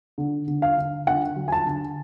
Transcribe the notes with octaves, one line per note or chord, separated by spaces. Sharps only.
D3
D3
F5
D3
D3 F#5
F#3
G#5
A5
D3